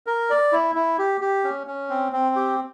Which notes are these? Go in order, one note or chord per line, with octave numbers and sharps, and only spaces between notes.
A#4
D5
E4
E4
G4
G4
C#4
C#4
C4
C4
G4